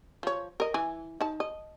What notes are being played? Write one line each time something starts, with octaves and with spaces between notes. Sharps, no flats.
F3 C#5
A#4 D#5
E3 G#5
D#4 A5
D#5